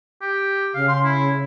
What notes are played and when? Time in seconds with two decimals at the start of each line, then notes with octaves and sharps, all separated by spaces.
0.22 G4
0.74 C#3 F5
0.88 C6
1.04 E4